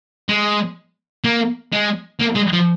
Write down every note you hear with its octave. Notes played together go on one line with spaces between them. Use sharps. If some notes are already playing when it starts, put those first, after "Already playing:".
G#3
A#3
G#3
A#3
G#3
F3